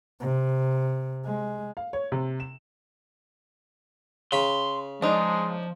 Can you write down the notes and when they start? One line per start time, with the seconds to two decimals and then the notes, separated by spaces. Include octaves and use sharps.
0.20 C3
1.25 G#3
1.77 F5
1.93 C#5
2.12 C3
2.40 E7
4.32 C#3 B5 C6
5.02 F3 G#3 D4 D#4